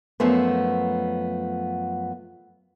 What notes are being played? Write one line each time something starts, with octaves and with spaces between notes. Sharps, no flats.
F#2 F3 A3 B3